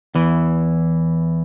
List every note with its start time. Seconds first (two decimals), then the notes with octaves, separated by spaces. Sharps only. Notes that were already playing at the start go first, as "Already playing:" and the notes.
0.15 E2 E3